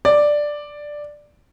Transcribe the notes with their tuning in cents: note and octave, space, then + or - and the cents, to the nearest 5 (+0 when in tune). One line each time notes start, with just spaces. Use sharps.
D5 +5